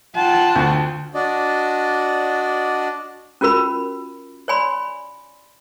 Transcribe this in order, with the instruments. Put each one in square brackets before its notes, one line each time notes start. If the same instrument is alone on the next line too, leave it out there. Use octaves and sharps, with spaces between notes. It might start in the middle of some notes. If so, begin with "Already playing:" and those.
[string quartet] F4 G5 [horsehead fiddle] F#5 A5
[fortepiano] D2
[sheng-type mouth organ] D4 F#4 D5 D#5
[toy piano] C#4 F4 F#4 A#4 B5
C#5 D5 G#5 B5 C6